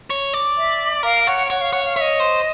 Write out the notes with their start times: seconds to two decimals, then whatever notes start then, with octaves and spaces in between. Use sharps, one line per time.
0.10 C#5
0.33 D5
0.57 E5
1.03 A#4 F5
1.27 C#5 F#5
1.50 C#5 F#5
1.61 F5
1.73 C#5 F#5
1.85 F5
1.96 C#5 E5
2.01 D#5
2.20 C5